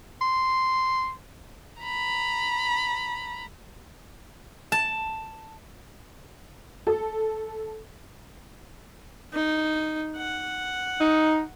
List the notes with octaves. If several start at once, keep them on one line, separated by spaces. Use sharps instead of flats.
C6
A#5 B5
A5
A4
D#4
F#5
D#4